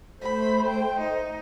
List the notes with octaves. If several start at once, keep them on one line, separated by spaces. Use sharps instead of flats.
A3 C5 B5
G5
D#4